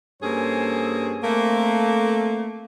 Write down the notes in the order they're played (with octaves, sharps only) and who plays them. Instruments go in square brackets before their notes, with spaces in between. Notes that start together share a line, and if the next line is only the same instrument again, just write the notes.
[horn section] G2 A#3 C#4 G#4 A4 C5
A3 A#3 C4